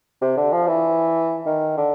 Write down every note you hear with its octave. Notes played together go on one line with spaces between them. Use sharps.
C3
D3
F3
E3
D#3
D3